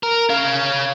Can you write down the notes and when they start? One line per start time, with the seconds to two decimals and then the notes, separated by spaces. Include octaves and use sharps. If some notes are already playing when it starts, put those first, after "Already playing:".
0.03 A#4
0.30 C#4 F5